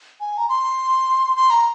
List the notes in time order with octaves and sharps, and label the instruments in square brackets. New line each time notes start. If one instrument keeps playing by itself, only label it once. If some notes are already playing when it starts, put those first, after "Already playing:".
[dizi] G#5
A#5
C6
C6
A#5